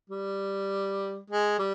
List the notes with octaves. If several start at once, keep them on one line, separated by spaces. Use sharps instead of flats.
G3
G#3
G3